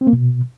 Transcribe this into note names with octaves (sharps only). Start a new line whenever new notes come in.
C4
A#3
B2